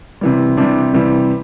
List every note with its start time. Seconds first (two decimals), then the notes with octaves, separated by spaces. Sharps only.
0.21 C3 E3 G3
0.57 C3 E3 G3 D4
0.94 C3 E3 G3